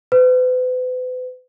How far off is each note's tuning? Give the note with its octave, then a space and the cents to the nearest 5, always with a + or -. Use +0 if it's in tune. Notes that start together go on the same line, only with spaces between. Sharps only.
B4 +40